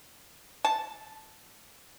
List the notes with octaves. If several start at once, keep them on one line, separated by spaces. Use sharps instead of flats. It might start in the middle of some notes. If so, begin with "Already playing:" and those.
A5